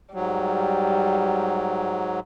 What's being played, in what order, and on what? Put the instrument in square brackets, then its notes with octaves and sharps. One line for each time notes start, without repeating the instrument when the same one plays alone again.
[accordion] G#2 F#3 [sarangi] G3